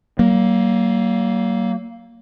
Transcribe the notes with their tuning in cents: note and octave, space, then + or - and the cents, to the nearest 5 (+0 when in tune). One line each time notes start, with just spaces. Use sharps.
F#3 +40 A#3 +0